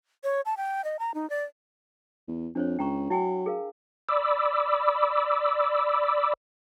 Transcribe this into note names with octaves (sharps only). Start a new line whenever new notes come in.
C#5
A5
G5
D#5
A#5
D#4
D5
E2
F2 D4 C5 C#5
C#2 G5 A#5 C#6
F#3 E4 G5 G#5
G#4 A#4 F5
D5 B5 D6 E6